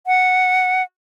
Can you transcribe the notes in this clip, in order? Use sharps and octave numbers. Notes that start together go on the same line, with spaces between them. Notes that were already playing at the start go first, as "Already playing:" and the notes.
F#5